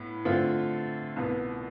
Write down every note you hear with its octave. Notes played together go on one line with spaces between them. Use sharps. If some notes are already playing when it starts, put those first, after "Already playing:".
Already playing: A2 B3
D3 A3 C4 F4
C2 B2 B3